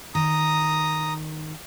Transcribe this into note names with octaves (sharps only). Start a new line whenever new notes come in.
D#3 A#5 D#6